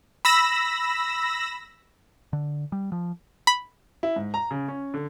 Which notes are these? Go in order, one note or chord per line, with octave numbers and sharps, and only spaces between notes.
B5 E6 A#6
D3
G3
F3
B5
E4
G#2
A#5
C#3
C#4
D3